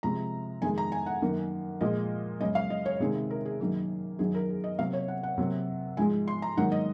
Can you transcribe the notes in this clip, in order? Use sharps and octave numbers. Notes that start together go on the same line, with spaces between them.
C3 F3 G#3 A#5
F2 D#3 G#3 G#5
A#5
G#5
F#5
F#2 D#3 A#3
A#2 F3 G#3 D#5
F#2 C#3 G#3 D#5
F5
D#5
C#5
C3 D#3 G#3 G#4
A#4
G#4
F#2 D#3 F#3 A#3
F#2 D#3 F#3 G#4
A#4
G#4
D#5
C3 F#3 A#3 F5
C#5
F#5
F#5
C3 F#3 A#3
G#2 F3 G#3 G#5
C6
A#5
G#2 D#3 F#3 A#3 F#5
D#5